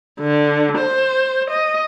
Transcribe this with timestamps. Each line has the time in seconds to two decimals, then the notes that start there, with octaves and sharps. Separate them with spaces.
0.21 D3
0.78 C5
1.51 D#5